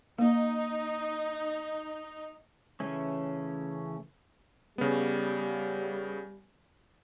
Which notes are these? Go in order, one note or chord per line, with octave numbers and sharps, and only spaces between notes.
A#3 D#4
C#3 E3 A3 C#4
C#3 G3 B3